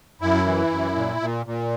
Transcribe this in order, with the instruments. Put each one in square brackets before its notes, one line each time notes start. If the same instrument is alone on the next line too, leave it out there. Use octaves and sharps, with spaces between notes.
[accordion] F#2 E4
E3
F#2
A#2
A#2
A#2